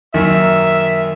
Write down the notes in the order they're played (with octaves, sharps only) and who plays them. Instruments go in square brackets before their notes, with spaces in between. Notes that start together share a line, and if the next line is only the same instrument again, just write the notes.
[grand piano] F#2 D#3 A#3 [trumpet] E5